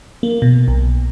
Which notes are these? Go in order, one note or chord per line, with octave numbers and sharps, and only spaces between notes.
A#3
B2
B1